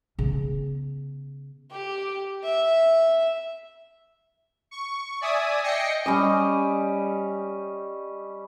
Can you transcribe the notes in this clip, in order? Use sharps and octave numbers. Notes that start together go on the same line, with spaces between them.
C#3 B3
G4
E5
C#6
D5 E5 G#5 D#6
D#5 G5 A#6 C7 C#7
G3 C#4 D#5